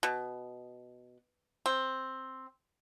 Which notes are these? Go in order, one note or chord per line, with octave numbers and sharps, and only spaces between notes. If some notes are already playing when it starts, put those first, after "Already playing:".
B2
C4